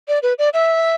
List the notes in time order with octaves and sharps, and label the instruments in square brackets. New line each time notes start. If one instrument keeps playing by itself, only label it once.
[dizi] D5
B4
D5
E5